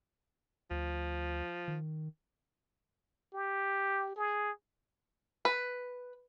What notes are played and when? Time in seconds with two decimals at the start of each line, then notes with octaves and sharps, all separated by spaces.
0.71 D2 F3
1.68 D#3
3.34 G4
4.16 G#4
5.45 B4